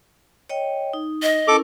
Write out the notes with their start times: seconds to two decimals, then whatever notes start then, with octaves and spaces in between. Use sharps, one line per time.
0.49 C#5 D#5 G5
0.93 D#4
1.23 D#5
1.48 C#4 E4 A4 A#4 D6